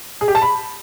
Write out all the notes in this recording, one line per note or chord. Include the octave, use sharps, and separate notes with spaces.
G#4
G4
A5
B5